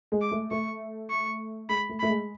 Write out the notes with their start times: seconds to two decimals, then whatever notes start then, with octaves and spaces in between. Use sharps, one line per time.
0.12 G#3
0.21 D6
0.31 A3
0.51 A3 C#6
1.10 C#6
1.69 G#3 B5
1.89 A3
2.00 A3 B5
2.09 G#3